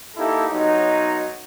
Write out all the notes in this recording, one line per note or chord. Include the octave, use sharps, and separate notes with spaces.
A#3 D#4 E4 G4 A4
B1 F#3 D#4